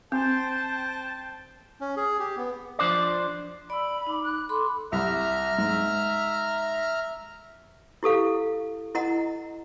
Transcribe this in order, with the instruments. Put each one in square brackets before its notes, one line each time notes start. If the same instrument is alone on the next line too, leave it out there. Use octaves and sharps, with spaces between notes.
[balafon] C4 [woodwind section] C5 G5 A5
[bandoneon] C#4
G#4
G4
B3
[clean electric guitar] F3 D4 C5 D5
[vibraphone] D5 E6 [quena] B5
[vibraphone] D#4 D6
[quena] F#6
[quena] A4 [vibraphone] B5 C6 D6
[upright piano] C2 [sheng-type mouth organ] E5 A#5 F6
[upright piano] G#2
[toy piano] E4 G4 A4 F5
E4 D#5 F#5 A#5